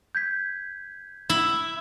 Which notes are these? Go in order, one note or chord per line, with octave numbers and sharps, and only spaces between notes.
G6 G#6 B6
E4